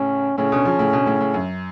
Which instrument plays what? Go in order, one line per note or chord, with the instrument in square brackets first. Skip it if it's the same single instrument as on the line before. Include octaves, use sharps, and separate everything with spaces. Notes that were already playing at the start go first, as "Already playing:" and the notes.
Already playing: [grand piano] A2 C#3 [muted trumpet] C#4
[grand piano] A2 C#3 [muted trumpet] C#4
[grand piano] B2 D3
C#3 F3
A2 C#3
B2 D3
A2 C#3
A2 C#3
F#2